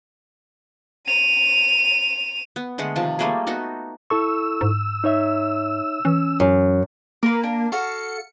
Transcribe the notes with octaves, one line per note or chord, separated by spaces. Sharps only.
D#7 F7
B3
D3 G#3 A3 F#5
C3 D#3 F3 A5
G3 A3 A#3 G#4
A3 B3 D#4 F#4
E4 A4 C#6 E6
G#2
D#4 C#5 E5
E3 C#4
F#2
A#3 A#4 B4
D4
F#4 A4 F5 C#7